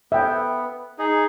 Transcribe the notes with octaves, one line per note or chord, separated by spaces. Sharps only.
B3 E5 G5
D#4 G#4